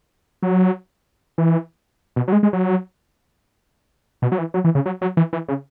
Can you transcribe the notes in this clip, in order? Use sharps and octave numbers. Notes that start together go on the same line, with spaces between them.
F#3
E3
B2
F#3
G#3
G#3
F#3
B2
F#3
E3
F#3
E3
C#3
F#3
F#3
E3
E3
C#3